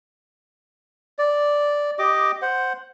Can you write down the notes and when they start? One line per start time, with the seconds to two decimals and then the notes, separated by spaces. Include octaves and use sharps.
1.18 D5
1.99 G4 D#5 D6
2.42 C5 F#5